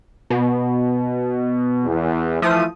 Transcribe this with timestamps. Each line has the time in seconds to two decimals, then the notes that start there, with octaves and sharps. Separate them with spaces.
0.30 B2
1.85 E2
2.42 E3 F3 A3 D#6